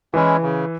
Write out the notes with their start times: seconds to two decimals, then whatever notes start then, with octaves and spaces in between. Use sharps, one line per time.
0.14 E3 G#3 C#4 E4
0.42 C#3